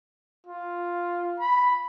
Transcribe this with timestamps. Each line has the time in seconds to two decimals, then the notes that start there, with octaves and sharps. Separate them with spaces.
0.47 F4
1.40 B5